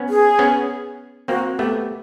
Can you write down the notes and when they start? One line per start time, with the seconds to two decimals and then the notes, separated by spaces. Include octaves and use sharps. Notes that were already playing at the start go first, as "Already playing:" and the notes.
Already playing: B3 C#4
0.09 G#4
0.39 B3 C#4
1.28 A#3 C4 F#4
1.58 A3 B3 G4